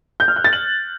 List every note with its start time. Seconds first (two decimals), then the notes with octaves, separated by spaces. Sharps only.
0.20 G6
0.28 F6
0.36 F#6
0.44 A6
0.53 F#7